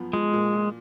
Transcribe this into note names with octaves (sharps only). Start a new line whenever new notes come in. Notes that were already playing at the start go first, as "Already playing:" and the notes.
Already playing: F#2 F3 B3
F3 G#3
A#2
A#2